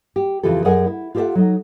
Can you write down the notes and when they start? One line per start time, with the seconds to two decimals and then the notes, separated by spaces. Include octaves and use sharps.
0.16 G4
0.43 F2 C#3 E3 F4 G4 A4
0.65 F#2 G#4 A#4 D#5 F#5 G#5
0.86 E4
1.15 F4 G4 A4 C5 E5 F#5
1.35 F#3 D#4